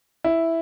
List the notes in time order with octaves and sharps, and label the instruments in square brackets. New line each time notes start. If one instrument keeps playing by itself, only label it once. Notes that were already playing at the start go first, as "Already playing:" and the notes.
[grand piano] E4